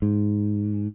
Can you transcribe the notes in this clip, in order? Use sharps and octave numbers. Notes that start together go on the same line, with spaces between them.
G#2